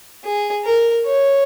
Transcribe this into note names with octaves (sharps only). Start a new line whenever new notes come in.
G#4
A#4
C#5